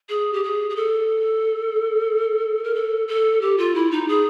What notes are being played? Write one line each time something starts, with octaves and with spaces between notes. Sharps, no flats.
G#4
G4
G#4
G#4
A4
A#4
A4
A4
G4
F4
E4
D#4
G#4